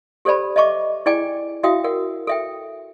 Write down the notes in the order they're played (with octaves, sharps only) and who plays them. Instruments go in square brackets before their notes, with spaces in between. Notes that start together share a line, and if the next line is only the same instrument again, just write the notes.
[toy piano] G4 A4 C5 D5 A5 B5
D#5 E5 A5 C#6 D6
E4 G#4 D5 G5 G#5 D6
E4 F#4 E5 F5 G5 D#6
A#4 F#5
A4 E5 G5